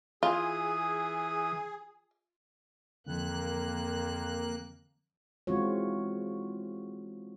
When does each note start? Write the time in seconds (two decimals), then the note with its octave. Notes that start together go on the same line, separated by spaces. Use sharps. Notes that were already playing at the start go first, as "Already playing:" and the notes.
0.23 E3 F4 G#4 D#6
3.06 F2 D3 E3 F3 A#3 F#6
5.47 E3 G#3 C4 F4 F#4 C#5